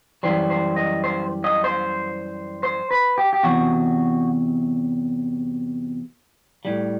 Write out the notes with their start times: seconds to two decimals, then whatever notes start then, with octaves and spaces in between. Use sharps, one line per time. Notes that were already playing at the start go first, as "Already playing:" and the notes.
0.23 F#2 E3 G3 C5
0.50 C5
0.76 D#5
1.04 C5
1.44 D#5
1.64 C5
2.63 C5
2.91 B4
3.18 G4
3.33 G4
3.43 E2 C3 F#3 F#4
6.65 A2 G3